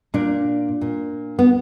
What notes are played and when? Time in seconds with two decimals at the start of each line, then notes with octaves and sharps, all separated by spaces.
0.14 A#2 D4
0.81 A#2
1.39 B3